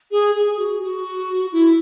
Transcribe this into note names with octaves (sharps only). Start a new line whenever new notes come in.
G#4
G#4
F#4
F#4
E4